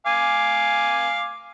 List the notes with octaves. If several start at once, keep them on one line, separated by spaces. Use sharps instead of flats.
F5 G#5 D6